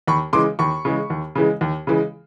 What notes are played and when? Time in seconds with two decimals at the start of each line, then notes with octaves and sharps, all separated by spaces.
0.08 D#2 B5 C#6
0.33 C#3 E3 G#3 C6 D6
0.59 D#2 B5 C#6
0.85 C#3 E3 G#3
1.10 D#2
1.35 C#3 E3 G#3
1.61 D#2
1.87 C#3 E3 G#3